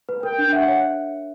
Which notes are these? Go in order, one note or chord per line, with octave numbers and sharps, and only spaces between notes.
B4
A#4 G5
D4
E5 F#5
C#5